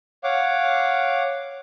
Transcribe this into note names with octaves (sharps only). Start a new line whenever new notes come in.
C#5 F5 F#5 D6